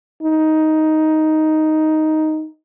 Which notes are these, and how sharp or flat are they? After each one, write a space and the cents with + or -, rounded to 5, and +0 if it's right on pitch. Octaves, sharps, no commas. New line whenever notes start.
D#4 +5